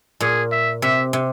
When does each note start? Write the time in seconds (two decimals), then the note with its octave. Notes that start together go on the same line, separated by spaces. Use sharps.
0.21 A#2 G#4
0.52 E5
0.82 C3 E5
1.13 C3